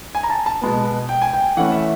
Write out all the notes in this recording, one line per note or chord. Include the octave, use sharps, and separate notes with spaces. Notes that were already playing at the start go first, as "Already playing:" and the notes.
G#5
A#5
A5
A5
B2 G#3 B3
G5
G#5
G5
E3 A3 C#4 F#5
E5